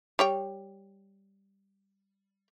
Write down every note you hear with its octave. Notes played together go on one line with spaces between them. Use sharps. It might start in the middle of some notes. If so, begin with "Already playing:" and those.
G3 C#5 G5